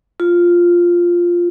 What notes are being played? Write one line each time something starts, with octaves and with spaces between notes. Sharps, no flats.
F4